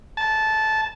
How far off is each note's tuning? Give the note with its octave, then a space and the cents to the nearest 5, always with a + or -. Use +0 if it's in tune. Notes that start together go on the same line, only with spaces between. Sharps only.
A5 -15